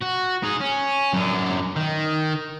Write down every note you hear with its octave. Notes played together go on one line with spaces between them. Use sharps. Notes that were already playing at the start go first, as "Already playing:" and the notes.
F#4
D#4 G#4
C#4
F#2 D4
D#3